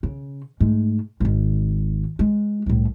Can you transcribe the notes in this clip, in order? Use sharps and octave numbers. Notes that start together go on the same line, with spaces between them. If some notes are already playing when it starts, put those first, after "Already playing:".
C#3
G#2 A3
G#1 D#3
G#3
C2 A2